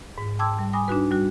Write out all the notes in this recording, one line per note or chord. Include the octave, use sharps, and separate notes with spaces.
G#2
G5 A5 C6 D6 E6 G#6
G3
G#5 B5 D6 D#6 A#6
D4 D#4 F#4 B4
G3 F#4